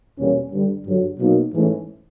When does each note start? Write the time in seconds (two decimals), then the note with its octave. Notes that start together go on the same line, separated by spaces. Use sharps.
0.19 E2 B2 G3 A#3 C#4
0.53 G2 D3 G3
0.87 G2 D3 F#3
1.20 B2 F#3 A#3 D#4
1.54 G#2 E3 A3 C#4